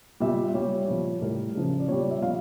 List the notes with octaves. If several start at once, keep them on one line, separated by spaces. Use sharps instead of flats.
A#2 G3 E5
A#2 G3 C#5
A#2 F3
A2 G3 A#4
C#3 F3
D5
A#2 G3 C#5
D5
E5
A#2 F3 F5